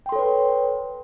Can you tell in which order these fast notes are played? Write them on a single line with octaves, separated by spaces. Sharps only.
G5 C6 A4 C#5 B4